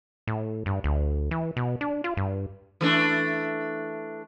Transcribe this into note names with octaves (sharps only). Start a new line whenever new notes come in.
A2
G2
D2
E3
B2
D4
F4
G2
E3 A3 D4